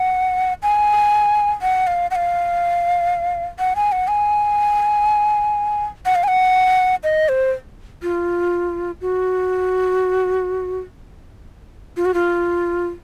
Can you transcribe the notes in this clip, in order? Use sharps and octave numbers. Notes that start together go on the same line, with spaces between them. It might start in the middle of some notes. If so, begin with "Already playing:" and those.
Already playing: F#5
G#5
F#5
F5
F#5
F5
F#5
G#5
F#5
G#5
F#5
F5
G#5
F#5
D#5
C5
F4
F#4
F4
F#4
F4